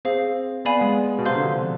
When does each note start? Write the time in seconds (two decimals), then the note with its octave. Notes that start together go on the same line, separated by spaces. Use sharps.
0.05 C4 G#4 C5 F5
0.65 B3 D5 F5 G#5 B5
0.81 G#3
1.18 B2
1.25 C3 C5 F5 C6 G6
1.35 D3
1.45 F3